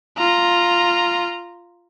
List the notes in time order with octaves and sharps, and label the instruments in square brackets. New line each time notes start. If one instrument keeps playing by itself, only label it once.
[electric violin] F4 A#5